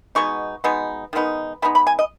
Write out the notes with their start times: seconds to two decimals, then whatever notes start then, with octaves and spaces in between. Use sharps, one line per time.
0.15 B2 G#3 B3 D#4 C#6
0.64 B2 G#3 B3 D#4
1.13 D#3 G#3 B3 D#4
1.62 D#3 G#3 B3 D#4 B5
1.75 B5
1.87 G#5
1.99 D#5